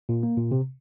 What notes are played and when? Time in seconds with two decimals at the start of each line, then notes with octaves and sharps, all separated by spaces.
0.09 A#2
0.23 A#3
0.38 A#2
0.51 C3